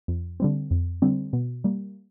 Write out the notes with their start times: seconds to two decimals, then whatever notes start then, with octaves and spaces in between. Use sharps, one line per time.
0.08 F2
0.40 D3 G3 C4
0.71 F2
1.02 D3 G3 C4
1.33 B2
1.64 G3 A#3